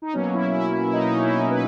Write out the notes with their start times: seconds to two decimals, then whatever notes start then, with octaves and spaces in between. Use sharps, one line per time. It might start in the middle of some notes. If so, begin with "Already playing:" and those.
0.02 D#4
0.13 B2 F#3 A#3 C#4
0.34 E4
0.53 E4
0.72 E4
0.85 E4
0.93 D#4
1.06 D#4
1.12 C#4
1.24 E4
1.31 D#4
1.50 B4